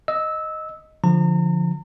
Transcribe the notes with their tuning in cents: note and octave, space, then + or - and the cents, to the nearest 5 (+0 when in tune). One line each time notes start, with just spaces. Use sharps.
D#5 +0 E6 -15
D3 +0 F3 +0 A#5 -40